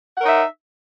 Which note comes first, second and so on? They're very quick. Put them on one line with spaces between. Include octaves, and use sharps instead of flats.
F#5 A#4 C#5 D#4 E5